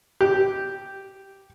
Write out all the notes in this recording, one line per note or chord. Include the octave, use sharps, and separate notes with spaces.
G4